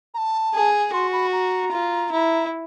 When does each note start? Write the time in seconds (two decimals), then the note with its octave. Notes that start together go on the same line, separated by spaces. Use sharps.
0.14 A#5
0.18 A5
0.54 G#4
0.93 F#4 C6
1.13 B5
1.32 A#5
1.71 F4
2.12 E4